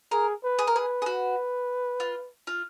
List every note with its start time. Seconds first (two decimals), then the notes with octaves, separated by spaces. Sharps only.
0.11 G#4 A#4
0.43 B4
0.59 G#4
0.67 A#4
0.75 G#4 B4
1.02 G#4
1.06 F#4
2.00 F4
2.47 F4